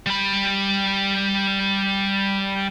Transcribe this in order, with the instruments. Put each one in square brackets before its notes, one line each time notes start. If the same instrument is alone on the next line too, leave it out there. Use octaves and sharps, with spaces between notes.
[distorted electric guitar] G3 B5